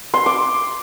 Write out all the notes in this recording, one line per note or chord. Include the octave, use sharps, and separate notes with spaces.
C6
D6